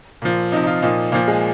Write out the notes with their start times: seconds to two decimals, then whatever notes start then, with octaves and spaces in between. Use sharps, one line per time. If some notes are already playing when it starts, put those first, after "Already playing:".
0.22 A#2 F3
0.52 C3 F3 D#4
0.63 D#4
0.67 F4
0.82 A#2 F3 D#4
1.12 A#2 F3 A#3
1.28 G#3